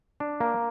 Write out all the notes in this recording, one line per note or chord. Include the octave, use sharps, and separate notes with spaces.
D4
A#3